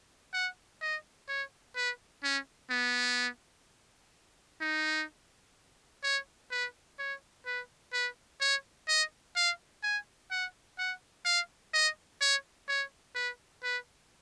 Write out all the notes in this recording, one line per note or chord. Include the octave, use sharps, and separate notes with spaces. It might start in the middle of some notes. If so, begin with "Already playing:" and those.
F#5
D#5
C#5
B4
C#4
B3
D#4
C#5
B4
C#5
B4
B4
C#5
D#5
F5
G#5
F#5
F#5
F5
D#5
C#5
C#5
B4
B4